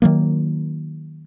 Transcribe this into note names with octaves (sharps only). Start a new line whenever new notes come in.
D#3 F#3 A#3